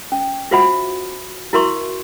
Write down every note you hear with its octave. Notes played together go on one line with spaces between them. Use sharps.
C#4
F4 F#4 C5 E5 F#5 B5
E4 F#4 A#4 E5 C6 C#6